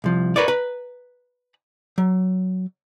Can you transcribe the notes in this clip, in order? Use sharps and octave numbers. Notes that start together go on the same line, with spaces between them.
C2 F3
A#4 B4 C#5 D5
B4 A#5
F#3